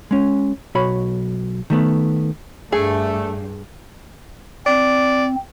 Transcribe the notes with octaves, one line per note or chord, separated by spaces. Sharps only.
G#3 C#4
B1 F#4 C#5 B5
D#3 A3 B3
G2 A3 G#4
C4 D5